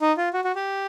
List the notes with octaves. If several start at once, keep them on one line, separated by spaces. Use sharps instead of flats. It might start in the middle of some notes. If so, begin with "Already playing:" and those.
D#4
F4
F#4
F#4
G4